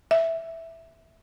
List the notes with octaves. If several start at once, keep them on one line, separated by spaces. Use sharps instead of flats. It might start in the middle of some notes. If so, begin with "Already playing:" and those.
E5